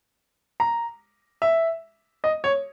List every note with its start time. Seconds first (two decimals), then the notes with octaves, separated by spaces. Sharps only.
0.60 A#5
1.42 E5
2.24 D#5
2.44 C#5